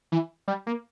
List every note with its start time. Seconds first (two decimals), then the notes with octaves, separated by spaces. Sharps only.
0.12 E3
0.48 G3
0.67 A#3